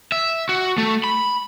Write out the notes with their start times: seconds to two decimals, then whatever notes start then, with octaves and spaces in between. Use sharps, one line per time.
0.12 E5
0.49 F#4
0.78 A3
1.04 B5